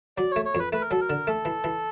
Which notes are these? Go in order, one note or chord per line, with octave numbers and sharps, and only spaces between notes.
F#3 D5
A3 C#5
C#5
F2 B4
A3 B4
A#4
F#3 A4
A#4
D3
A3 A4
E3
E3